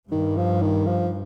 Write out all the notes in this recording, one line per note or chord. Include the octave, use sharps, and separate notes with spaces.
G2 D#3
F3
D#3
F3